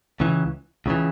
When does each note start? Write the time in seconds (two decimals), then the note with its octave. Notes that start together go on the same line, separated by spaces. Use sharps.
0.20 C#2 C#3 E3
0.86 C#2 C#3 E3